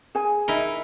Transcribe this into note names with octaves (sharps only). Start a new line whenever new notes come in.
G#4 G#5
D#4 E4 A#4